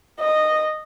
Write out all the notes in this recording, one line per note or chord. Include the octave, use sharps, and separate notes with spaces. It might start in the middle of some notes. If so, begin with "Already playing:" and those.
D#5